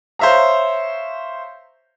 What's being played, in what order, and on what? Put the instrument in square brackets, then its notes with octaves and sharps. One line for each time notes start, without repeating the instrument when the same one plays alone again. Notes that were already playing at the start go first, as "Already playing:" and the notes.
[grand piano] C5 C#5 E5 F5 A#5